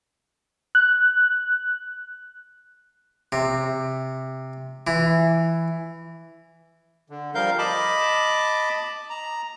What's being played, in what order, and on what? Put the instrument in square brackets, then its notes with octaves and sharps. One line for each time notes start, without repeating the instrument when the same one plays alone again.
[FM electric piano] F#6
[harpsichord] C3
E3
[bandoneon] D3
F3 G3 A#4 F5 G6
D#5 A5 B5 D6
A#5